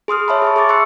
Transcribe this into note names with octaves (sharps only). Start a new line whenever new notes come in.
G#4 C6 D#6 F6
C#5 E5 A5 B5
G#4 A5 C#6
G#4 C#6 D6 A6
C6 C#6 E6 F#6 C#7